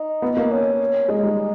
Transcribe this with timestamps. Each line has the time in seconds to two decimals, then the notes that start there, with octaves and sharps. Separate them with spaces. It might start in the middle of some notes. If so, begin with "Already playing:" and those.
Already playing: D#4
0.22 B3
0.37 A#3
0.51 C#4
1.08 G#3 D#4
1.23 G3 D#4